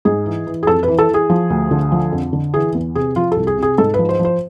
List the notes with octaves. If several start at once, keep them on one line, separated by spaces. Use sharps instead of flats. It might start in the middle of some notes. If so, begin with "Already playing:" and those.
G#2 G#4
E3
E3
G#4
F2 A4
B4
E3
A4
E3
G#4
F3
D2
D3
F3
F2
D3
E3 G#4
E2
C3 G#4
F3 F4
C2 A4
G#4
C3
G#4
G#2 A4
B4
F3
C5
F3
C5